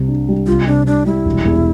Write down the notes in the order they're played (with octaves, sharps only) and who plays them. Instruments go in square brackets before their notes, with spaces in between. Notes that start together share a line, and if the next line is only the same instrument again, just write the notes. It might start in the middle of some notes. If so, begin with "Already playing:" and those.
Already playing: [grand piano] C2 C3
D4
G3
[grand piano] C2 [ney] F4
[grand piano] C3 [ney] D4
[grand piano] C2 [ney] D4
[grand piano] G3 [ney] E4
[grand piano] E1
E2